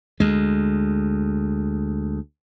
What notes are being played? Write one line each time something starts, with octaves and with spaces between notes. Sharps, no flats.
D2 G#3